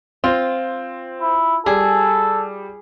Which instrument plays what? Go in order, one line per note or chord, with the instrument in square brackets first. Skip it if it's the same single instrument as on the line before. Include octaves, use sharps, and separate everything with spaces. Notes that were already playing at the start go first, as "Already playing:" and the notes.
[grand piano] C4 [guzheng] F4
[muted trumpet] E4
[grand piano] G3 [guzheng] G#4 [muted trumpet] A4